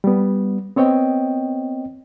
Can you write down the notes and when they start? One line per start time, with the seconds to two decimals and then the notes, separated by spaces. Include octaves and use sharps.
0.04 G3 B3
0.76 B3 C4 C#5 D#5 G5